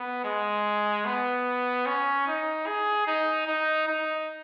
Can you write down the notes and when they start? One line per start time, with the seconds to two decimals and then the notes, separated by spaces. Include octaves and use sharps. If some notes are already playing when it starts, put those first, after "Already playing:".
Already playing: B3
0.24 G#3
1.05 B3
1.86 C#4
2.27 D#4
2.66 G#4
3.07 D#4
3.47 D#4
3.88 D#4